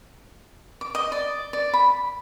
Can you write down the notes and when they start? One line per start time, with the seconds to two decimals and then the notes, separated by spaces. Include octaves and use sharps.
0.81 D6
0.95 D#5
1.12 D5
1.53 D5
1.74 B5